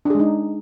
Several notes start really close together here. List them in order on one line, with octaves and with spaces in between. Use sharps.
D4 G#4 G#3 D#4